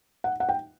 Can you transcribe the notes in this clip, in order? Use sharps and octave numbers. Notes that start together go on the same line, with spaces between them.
F#5
F#5
G5